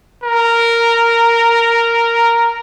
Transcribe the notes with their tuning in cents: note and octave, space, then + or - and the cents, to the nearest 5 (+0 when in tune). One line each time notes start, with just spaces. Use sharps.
A#4 -5